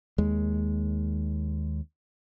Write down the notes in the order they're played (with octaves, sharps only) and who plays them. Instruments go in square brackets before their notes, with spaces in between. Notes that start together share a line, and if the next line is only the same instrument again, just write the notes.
[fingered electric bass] D#2 G#3